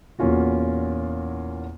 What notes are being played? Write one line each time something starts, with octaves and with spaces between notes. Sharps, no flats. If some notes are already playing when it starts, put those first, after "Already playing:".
E2 A#2 A#3 C#4 F4 F#4